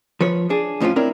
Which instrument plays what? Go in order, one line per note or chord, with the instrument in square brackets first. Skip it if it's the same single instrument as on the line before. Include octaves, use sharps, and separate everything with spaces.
[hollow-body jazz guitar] F3 B4 C#5
D4 G#4
F2 A2 F3 C#4 F4
C4 D4 E4 A#4 C#5